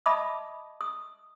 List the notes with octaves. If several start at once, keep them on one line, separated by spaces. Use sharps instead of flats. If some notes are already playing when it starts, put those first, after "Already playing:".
D#5 E5 A5 B5 D6 D#6
D#6